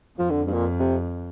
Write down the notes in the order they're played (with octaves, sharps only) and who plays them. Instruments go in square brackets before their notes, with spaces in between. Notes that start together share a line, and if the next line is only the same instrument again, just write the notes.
[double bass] F2 [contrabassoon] F3
[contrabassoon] D3
G2
A#2
C3